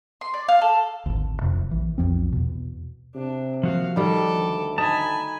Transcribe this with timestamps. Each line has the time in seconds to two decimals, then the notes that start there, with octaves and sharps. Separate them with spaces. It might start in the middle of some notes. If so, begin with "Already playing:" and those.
0.21 C6
0.34 D5
0.49 F5
0.62 A4
1.06 G#1 D2
1.42 D1 F2 C3
1.71 A#1 E3
1.98 B1 F2 F3 C4
2.32 E2 B2
3.15 C3 D4
3.63 F3 A#3 F#4 F5
3.96 D#3 G3 A4 D6
4.31 D2
4.78 D#4 G#5 A5 B5